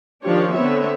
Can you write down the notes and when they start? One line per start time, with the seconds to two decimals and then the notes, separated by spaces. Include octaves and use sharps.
0.22 D#3 F3 D4 G4 C#5
0.53 D3 B3 C4 C#5 E5